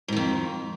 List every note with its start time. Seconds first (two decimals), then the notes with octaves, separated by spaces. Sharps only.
0.08 G#2
0.12 D#3
0.17 F2